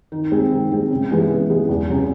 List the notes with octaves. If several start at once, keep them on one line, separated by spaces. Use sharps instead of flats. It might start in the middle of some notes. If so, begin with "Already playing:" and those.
D#3
G#3 C4
D#3
G#3 C4
C#3
E3 G#3 B3
C#3
E3 G#3 B3
E2
C#3 F#3